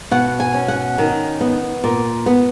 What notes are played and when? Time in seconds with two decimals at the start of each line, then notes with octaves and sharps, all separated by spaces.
0.11 B2 F#5
0.40 G#5
0.54 C#4
0.68 F#5
0.98 D#3
1.41 B3
1.84 A#2
2.26 B3